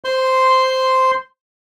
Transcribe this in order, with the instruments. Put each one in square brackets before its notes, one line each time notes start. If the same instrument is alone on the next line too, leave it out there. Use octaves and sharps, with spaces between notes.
[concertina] C5 C6